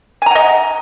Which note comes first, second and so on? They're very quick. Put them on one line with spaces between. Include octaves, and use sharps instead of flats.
G#5 A#5 F#5 D#5